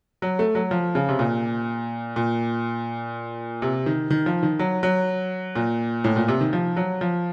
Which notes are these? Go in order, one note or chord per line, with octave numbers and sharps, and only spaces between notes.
F#3
A3
F#3
F3
C#3
C3
A#2
A#2
C3
D#3
D#3
F3
D#3
F#3
F#3
A#2
A2
A#2
C3
D#3
F3
F#3
F3